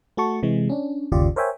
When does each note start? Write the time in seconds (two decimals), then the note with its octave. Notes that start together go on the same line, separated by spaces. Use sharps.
0.17 A3 F#4 A5 C#6
0.43 C3 E3 G#3
0.70 C#4 D4
1.12 G1 D#2 C#3 F4 G4 D5
1.36 A#4 C5 C#5 E5 G5 G#5